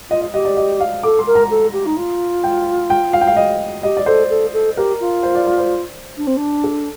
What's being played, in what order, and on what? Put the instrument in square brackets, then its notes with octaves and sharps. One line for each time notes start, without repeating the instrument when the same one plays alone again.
[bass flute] F4 [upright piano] D#5
[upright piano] D#5
[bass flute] G4 [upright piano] D#5
[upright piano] D5
D#5
F5
[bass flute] A4 [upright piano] D6
[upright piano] C6
[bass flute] A#4
[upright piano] A#5
[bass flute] A4
G4
D#4
F4
[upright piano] G5
G5
F5
G5
F5
D#5
[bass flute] G4 [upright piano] D#5
[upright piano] D5
[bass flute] A4 [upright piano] C5
[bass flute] A4
A4
[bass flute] G4 [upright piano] A#4
[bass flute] F4
[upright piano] C5
D5
D5
C5
[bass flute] D4
C4
D4
[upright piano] A4